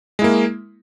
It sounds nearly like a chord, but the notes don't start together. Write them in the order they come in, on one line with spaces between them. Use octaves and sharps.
G#3 E4 A#3